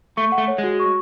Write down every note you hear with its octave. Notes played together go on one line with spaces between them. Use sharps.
A3 C#6
F#5
A3
C#5
G#3
F#4
C#6